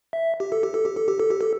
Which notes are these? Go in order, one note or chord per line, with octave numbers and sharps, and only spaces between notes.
E5
G4
A4
G4
A4
G4
A4
G4
A4
G4
A4